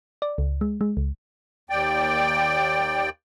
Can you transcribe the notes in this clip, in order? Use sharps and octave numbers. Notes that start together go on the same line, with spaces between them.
D5
C#2
G#3
G#3
C#2
D#2 D5 G5